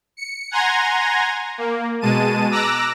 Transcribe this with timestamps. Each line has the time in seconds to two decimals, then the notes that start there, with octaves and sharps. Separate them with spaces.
0.17 C#7
0.51 F#5 G#5 A#5 C6 G#6 A#6
1.58 A#3
2.01 B2 G#3 A5 D#7
2.51 A#5 D6 E6 F#6 A#6